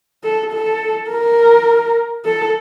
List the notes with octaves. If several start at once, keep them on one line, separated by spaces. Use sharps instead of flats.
A4
A4
A#4
A4